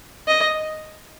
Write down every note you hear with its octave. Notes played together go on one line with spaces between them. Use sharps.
D#5